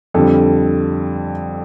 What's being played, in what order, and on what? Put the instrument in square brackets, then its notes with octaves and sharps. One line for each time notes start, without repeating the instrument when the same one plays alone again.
[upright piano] F2 D3 G3 A4